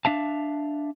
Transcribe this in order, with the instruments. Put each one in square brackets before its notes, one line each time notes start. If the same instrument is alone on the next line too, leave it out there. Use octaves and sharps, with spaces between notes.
[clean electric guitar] D4 E5 F5 A5